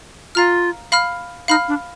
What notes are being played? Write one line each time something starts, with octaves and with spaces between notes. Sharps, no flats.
F4 F5 A#5 F6
F5 B5 F6
D#4 F5 B5 F6
D4